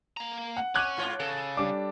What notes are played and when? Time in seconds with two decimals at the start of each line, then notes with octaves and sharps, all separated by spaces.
0.17 A#3 A#5
0.57 F#5
0.75 C#4 D6 F#6 G#6
0.97 G#2 F4 C#5
1.20 C#3 A4
1.57 G3 D4 D6